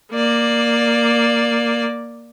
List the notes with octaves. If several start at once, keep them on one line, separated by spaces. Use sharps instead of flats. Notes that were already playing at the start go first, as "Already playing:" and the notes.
A#3 D5